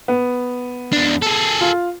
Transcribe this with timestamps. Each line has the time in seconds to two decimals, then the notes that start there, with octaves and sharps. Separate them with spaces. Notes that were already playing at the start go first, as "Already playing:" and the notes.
0.08 B3
0.93 E2 D4
1.22 G#4 A4
1.61 F4